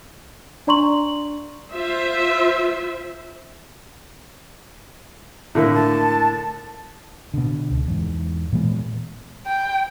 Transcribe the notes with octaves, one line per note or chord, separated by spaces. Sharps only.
D4 D5 A#5 C6 C#6 F#7
F4 C5 E5
A2 D3 A#3 E4
A5
B2 D3
C#2
E2 G#2
A#2 E3 G#3 B3
G5